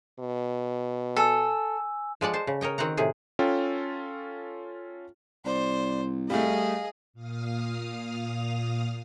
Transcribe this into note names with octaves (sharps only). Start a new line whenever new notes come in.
B2
A4 G#5 E6
F3 G#3 D5 F#5
C5 A5
C#3
A#4 C#5 D#5 G5
D#3 C4 F#4 F#5 A#5
A2 C3 G#4
C#4 F4 A4 G5
C2 C5 D5
G3 A3 G#4 D#5 F5
A#2 F5 D#6 F6